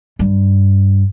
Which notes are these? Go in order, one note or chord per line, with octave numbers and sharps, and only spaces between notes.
G2